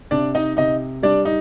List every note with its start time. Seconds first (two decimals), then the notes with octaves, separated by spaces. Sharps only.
0.11 C3 D4 D5
0.35 D#4 D#5
0.57 C3 D#4 D#5
1.03 G3 D4 D5
1.25 D#4